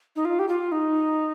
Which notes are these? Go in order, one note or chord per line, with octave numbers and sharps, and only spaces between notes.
D#4
F4
G4
F4
D#4